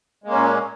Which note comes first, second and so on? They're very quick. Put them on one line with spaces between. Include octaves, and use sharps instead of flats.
G#3 A#3 C#4 A#2